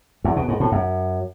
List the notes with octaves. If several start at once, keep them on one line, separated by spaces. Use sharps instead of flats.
E2
B2
G#2
A2
F#2